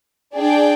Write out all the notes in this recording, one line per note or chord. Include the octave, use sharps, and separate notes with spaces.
D4 G#4 D5 G5